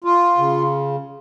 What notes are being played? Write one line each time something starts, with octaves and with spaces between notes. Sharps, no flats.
F4
C#3